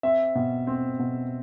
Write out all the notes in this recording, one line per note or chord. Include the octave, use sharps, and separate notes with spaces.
C4 E5
B2
C4
B2